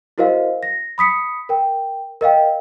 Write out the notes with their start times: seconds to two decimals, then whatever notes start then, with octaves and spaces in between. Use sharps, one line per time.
0.18 E4 F#4 A#4 C5 D#5 F5
0.63 A#6
0.98 B5 D#6 B6 C#7
1.49 A#4 G5
2.21 A#4 D#5 F5 G5